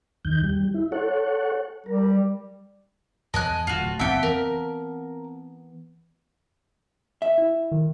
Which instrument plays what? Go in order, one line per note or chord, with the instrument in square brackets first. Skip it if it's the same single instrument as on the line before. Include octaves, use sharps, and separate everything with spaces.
[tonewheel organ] E2 D#3 G6
G3
E4
A4 C#5 F#5
[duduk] G3 [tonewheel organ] A#4
[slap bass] E2 [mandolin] D#5 G#5 F#6 [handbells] A5
[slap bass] D1 A3 [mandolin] F4 F#4
[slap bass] F#1 E2 C3 [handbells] C4 F#5 A5 [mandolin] E5 G5
[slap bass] E3 B3 [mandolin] A#4
[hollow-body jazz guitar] E5
[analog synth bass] E4
D#3